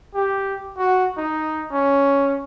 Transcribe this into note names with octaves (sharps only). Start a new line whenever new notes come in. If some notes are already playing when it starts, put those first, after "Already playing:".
G4
F#4
D#4
C#4